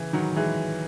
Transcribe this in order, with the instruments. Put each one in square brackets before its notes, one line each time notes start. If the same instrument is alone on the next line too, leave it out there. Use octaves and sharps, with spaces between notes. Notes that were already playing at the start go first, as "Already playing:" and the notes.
Already playing: [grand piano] C#3 E3
D#3 F#3
E3 G#3